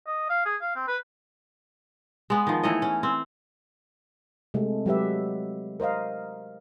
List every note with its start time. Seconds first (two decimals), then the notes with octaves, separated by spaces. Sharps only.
0.07 D#5
0.29 F5
0.45 G#4
0.61 F5
0.76 C4
0.88 B4
2.30 G#3 B3
2.47 D#3 F3
2.63 E3 A3 C#5 D#5
2.82 C#4
3.03 C4
4.54 C3 G#3 A3
4.86 F#3 G#3 G4 B4 E5
5.80 A#4 C5 D#5 F5